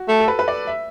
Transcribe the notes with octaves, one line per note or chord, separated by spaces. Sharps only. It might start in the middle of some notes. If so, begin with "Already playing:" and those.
Already playing: F#4
A3
A4
B4
B4
D5
E5